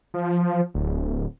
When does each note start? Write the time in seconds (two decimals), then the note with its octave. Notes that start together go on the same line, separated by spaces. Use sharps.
0.14 F3
0.75 D1